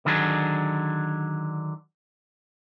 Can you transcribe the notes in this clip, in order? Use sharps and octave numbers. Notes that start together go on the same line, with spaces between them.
D3 D#3 F#3 D4 G#4